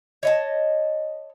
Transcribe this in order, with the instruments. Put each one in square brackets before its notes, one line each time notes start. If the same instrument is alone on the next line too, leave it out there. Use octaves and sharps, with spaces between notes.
[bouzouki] C#5 D#5 A5